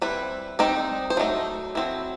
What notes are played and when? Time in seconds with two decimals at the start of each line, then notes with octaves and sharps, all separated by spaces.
0.02 G3 C4 E4 B4
0.59 G3 C4 D#4
1.10 C5
1.17 F#3 A3 D#4
1.75 F#3 C4 E4